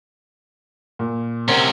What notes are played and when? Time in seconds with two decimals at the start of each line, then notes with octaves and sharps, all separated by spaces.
0.99 A#2
1.48 C3 C#4 A#4 C5 F#5